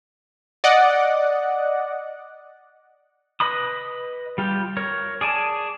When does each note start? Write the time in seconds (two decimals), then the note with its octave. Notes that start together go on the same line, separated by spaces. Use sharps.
0.64 D5 D#5 F#5
3.40 B4 D#5 B5 D#6
4.38 G3 F4 G4
4.77 A#4 C#5
5.21 G#4 D5 G#5 A5